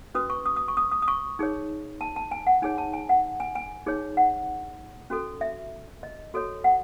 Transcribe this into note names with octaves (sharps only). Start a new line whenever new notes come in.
C#4 F#4 B4 D#6
C#6
D#6
D#6
C#6
D#6
D#6
D#6
C#6
D#4 G#4 C#5
A5
A5
G#5
F#5
D#4 G#4 C#5 G#5
A5
G#5
F#5
G#5
G#5
D#4 G#4 C#5
F#5
C#4 F#4 A4
E5
D#5
F#4 A4 C#5
F#5